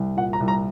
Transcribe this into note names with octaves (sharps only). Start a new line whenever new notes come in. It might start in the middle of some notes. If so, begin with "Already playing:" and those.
Already playing: C2
A#2 F#5
A#5
C2
A#5